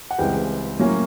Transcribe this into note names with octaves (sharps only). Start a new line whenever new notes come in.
F#5
C#2 C#3 E3 G3 C4 G5
A2 F#3 A#3 C#4